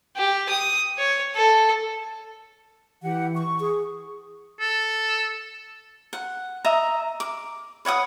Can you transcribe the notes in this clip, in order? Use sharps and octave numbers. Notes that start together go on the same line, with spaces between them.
G4
D#6
C#5
A4
E3 G4 F#5
C#6
G#4
A4
F#5
D#5 E5 A#5 D#6
D6
B4 C#5 F#5 D#6